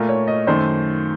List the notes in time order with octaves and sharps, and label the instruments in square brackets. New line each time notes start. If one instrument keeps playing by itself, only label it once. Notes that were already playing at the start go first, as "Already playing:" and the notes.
Already playing: [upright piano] A#2 A3 A#4
C#5
D#5
F#2 D#3 A3 C5